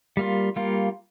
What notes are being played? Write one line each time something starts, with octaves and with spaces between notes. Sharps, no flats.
G3 A#3 F4
G3 A#3 F4